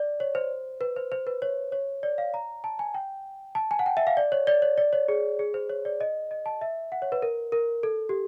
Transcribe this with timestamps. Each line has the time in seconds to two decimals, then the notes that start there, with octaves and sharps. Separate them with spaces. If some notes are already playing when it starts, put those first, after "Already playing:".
Already playing: D5
0.20 C#5
0.35 C5
0.81 B4
0.96 C5
1.12 C5
1.27 B4
1.42 C#5
1.72 C#5
2.03 D5
2.18 F5
2.34 A#5
2.64 A5
2.79 G#5
2.94 G5
3.55 A5
3.71 G#5
3.79 F#5
3.86 G5
3.97 E5
4.07 F5
4.17 D5
4.32 C#5
4.47 D5
4.62 C#5
4.78 D5
4.93 C#5
5.08 G#4
5.39 G#4
5.54 C5
5.70 C#5
5.85 D5
6.01 D#5
6.31 D#5
6.46 A5
6.61 E5
6.92 F#5
7.02 C#5
7.12 B4
7.22 A#4
7.52 A#4
7.83 A4
8.09 G4